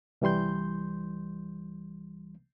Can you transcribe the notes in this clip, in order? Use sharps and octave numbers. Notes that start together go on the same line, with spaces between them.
C2 E3 G3 C6 G6